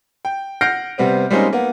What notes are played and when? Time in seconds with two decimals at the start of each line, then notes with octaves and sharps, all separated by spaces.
0.25 G5
0.61 F#5 F6 G6 A#6 C7 D7
0.98 C3 G3 B3 C4
1.31 G3 G#3 A#3 C4 C#4 D#4
1.53 A#3 B3